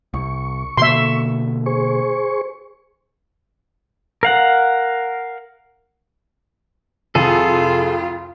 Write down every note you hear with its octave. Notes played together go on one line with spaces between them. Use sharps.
C2 C#6
B2 D3 A#3 E5 C6
G#4 C5 C#6
A#4 F5 F#5
C2 F2 F4 G#4 A4 D#7